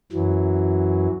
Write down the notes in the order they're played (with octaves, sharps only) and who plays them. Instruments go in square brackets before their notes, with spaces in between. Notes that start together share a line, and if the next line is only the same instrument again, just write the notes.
[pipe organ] F#2 E3 F#3